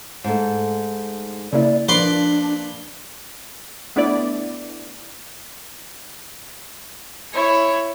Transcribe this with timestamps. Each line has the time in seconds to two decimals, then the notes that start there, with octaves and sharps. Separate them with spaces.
0.24 G#2 A3
1.53 C#3 A#3 E4 D5
1.89 F3 A#3 D4 B4 D5 C6
3.96 A3 B3 D4 E4 D5
7.34 E4 C#5